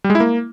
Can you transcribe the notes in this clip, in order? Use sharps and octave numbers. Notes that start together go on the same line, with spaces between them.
G3
G#3
E4
A#3